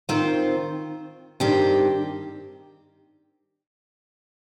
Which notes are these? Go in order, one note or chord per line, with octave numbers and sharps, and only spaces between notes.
D#3 C4 F4 C5
G2 D#3 C4 G4